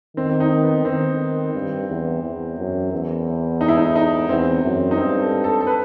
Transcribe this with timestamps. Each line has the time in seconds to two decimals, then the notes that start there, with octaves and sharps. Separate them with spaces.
0.17 D#3 C4
0.30 C4
0.40 D#4
0.63 B3
0.85 D#3 C4
1.54 G2
1.88 E2
2.23 E2
2.58 F#2
2.92 E2
3.61 D#4
3.68 E4
3.77 D#4
3.96 D#4
4.29 E2 C4
4.64 F#2
4.91 D#4
4.98 G2 C4
5.21 A4
5.44 A4
5.61 A4
5.67 B4